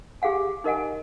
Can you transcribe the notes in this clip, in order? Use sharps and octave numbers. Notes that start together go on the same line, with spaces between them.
G4 G#4 F5 F#5 G#5
D#4 A#4 D#5 F#5 G#5